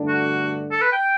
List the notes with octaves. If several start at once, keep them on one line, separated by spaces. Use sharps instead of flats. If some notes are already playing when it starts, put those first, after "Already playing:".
Already playing: G2 D3 A3 D4
F#4
A4
B4
G5